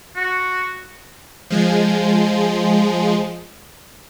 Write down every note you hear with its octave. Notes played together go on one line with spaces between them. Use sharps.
F#4
F3 G#3